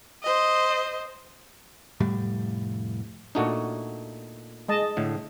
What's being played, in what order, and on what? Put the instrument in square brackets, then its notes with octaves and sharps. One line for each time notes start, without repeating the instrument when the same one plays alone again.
[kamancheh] C5 D#5
[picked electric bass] F1 A2 G3
[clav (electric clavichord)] A#2 A3 D#4 [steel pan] D4 F#4
[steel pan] G#3 D#5 A5
[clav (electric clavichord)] A2 D3